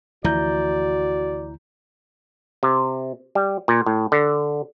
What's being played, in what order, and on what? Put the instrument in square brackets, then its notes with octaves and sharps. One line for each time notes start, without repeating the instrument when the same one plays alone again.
[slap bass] D2 E3 F3 [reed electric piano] E4 A#5 G6 [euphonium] F#4 [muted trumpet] D5
[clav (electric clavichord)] C3
G3
A#2
A2
D3